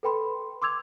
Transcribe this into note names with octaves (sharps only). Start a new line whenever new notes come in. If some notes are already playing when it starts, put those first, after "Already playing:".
A4 B4 G5 B5 C6
C6 D6 E6 G#6 F7